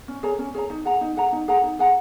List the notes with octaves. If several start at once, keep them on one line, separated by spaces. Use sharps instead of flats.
C#4
G#4 C#5 A#5
C#4
G#4 C#5 A#5
D#4
G#4 F#5 A#5
D#4
G#4 F#5 A#5
D#4
G#4 F#5 A#5
D#4
G#4 F#5 A#5